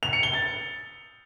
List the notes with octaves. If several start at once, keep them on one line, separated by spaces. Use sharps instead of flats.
F7
C#7
G7
A6